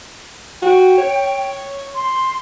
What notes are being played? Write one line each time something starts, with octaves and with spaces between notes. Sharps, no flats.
F#4 G5
C#5
C6